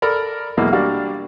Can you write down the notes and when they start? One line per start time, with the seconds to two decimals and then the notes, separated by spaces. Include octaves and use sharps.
0.02 A4 A#4 D5 B5
0.57 B1 B2 E3 G#3 A#3
0.73 G3 A#3 D4 F#4 F5